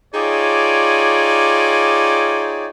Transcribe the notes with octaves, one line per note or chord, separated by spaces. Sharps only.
D#4 F4 G4 G#4 C#5 D5